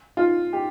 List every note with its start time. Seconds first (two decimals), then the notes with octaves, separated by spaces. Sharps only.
0.17 F4
0.53 G4